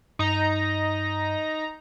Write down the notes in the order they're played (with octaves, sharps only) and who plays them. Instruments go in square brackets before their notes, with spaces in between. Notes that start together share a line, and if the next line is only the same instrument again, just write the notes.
[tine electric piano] G2 [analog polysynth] D#4 A#5